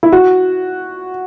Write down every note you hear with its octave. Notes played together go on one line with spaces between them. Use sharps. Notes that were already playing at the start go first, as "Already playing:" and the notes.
E4
F#4